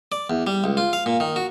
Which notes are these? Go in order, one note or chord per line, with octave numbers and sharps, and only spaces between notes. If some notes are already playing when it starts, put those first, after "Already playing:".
D5
E2
G3
C#2
F4
F5
A#2
D#3
F#4